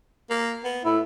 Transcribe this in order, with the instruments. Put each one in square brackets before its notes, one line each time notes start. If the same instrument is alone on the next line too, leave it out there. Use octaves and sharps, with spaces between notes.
[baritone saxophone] A#3
B3
[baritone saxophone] A2 [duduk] E4